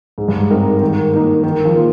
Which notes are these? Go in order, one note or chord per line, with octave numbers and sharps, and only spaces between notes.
G#2 G#3
G2
G#2
C4 D#4 A#4
D#3
A#3 D#4
D#3
F3
A#3 F4